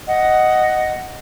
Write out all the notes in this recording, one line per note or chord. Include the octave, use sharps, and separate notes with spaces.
D#5 F#5